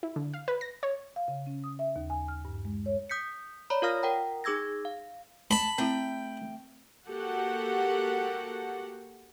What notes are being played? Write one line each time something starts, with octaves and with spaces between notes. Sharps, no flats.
E4
D3
F5
B4
A#6
C#5
F5
C#3
C#4
D#6
E5
D#2
G#5
F6
G2
G#3
C#5
D#6 G6 B6 C#7
C#5 D5 A#5 B5
F4 A#4 F5 D#6 F6 A#6
A#4 F#5 G5 A#5
D#4 G#4 D6 E6 G#6 A#6
F5
A5 B5
A3 C4 E4 G5
A#3 F#4 G4 A4 F#5